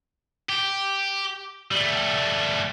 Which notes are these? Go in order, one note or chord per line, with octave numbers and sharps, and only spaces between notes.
G4
G3 A3